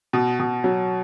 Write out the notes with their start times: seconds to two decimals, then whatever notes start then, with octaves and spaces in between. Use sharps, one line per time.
0.13 B2
0.40 B2
0.64 F#3